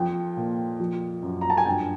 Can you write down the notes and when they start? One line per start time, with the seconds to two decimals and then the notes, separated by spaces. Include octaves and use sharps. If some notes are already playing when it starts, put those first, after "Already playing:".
Already playing: F2 F3 G5
0.37 A#2
0.80 F3
1.22 F#2
1.41 A#5
1.50 A5
1.57 G#5
1.65 G2 G5